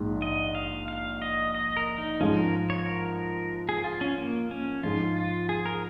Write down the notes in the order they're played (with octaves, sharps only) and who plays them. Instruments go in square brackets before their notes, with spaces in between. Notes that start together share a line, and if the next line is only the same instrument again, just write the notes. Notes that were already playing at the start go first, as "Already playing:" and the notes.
Already playing: [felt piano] A#1 G#2 G#3 D#4
[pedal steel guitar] D#5
F5
F5
D#5
D#5
A#4
D#4
[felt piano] G#2 F3 G#3 [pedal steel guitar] C#4
[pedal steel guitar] A#4
C#5
A#4
G#4
F4
C#4
A#3
C#4
[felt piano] G#2 F3 G#3 [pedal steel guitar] F4
[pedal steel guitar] F4
G#4
A#4